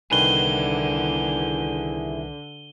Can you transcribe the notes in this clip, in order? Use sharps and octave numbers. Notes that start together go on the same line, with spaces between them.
C2 D3 D#3 E4 G#4 B4 D#7 G7